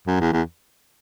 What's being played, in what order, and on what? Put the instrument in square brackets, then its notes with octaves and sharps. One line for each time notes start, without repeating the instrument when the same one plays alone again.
[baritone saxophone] F#2
E2
E2